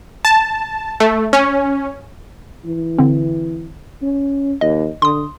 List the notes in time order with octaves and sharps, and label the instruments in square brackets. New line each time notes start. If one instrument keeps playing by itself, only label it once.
[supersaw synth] A5
A3
C#4
[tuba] E3
[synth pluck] D3 C4
[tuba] C#4
[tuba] D#2 [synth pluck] D#5
[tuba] D3 [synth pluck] C6 D#6